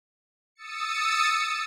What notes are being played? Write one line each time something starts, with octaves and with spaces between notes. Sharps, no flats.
D#6 E6 A6 C#7